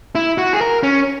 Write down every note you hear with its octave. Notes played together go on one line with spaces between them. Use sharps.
E4
F#4
G#4
A#4
C#4